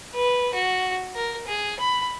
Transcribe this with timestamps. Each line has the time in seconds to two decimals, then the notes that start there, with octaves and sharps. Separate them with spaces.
0.14 B4
0.54 F#4
1.15 A#4
1.47 G#4
1.80 B5